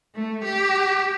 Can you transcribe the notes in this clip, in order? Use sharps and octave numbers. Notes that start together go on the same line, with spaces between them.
A3
G4